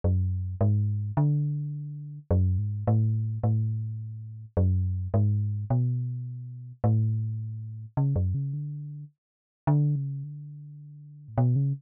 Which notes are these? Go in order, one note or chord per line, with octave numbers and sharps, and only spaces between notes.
F#2
G#2
D3
F#2
G#2
A2
A2
F#2
G#2
B2
A2
C#3
F#2
C#3
D3
D3
C#3
D3
A2
B2
C#3